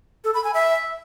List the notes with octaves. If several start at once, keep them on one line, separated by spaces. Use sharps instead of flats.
A4
B5
G#5
E5